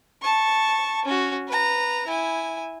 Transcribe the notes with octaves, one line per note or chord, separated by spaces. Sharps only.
A5 C#6
C#4 F#4
B4 A#5
E4 G#5